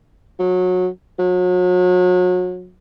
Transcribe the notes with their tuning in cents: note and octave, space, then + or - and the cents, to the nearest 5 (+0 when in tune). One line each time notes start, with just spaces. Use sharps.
F#3 -25
F#3 -35